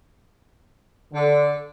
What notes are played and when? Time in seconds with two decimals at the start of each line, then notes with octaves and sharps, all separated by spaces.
1.14 D3